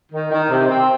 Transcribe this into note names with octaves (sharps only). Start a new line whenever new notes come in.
D#3
D#3
C3
C4